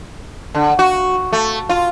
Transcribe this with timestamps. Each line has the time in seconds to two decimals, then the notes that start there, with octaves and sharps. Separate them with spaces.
0.55 D3
0.79 F#4
1.33 A3
1.69 F4